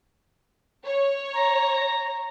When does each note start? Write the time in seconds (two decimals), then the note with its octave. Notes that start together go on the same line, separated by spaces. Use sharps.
0.85 C#5
1.34 A#5